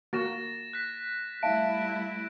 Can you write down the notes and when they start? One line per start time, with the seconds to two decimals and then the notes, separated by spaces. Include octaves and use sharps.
0.13 A#3 F#4 A6 A#6 E7
0.73 F#6 B6
1.43 G3 A3 E4 E5 F5 A5 D7